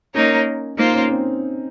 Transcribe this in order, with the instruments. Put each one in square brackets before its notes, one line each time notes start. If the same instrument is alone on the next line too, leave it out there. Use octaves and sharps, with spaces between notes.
[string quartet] A#3 D#4 A#4 C#5 [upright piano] C#4
[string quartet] A#3 F4 C5 [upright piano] D#4
[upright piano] C#4
C4